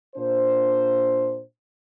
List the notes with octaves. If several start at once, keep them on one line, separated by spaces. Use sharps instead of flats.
A#2 D4 C5